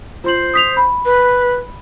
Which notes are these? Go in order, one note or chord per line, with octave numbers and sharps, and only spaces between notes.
F4 C5 C6 F#7
D#6 B6 F7
B5
B4